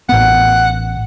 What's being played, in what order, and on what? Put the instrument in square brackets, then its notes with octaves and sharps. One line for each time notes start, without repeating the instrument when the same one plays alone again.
[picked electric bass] A1 B3 [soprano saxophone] F#5